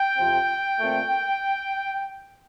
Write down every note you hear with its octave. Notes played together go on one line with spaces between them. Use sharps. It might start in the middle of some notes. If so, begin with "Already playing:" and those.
Already playing: G5
F2 C3 F3 C4
A#2 A3 C4